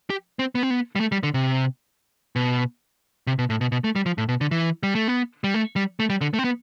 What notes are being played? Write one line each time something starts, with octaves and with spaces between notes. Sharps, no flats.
G4
C4
B3
C4
B3
G3
A3
G3
D3
C3
B2
C3
B2
A2
B2
B2
A3
G3
F3
A2
B2
D3
E3
G3
A3
B3
G3
A3
G3
A3
G3
D3
A3
C4
B3